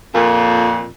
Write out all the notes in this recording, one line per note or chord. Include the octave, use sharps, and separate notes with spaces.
F2 A#2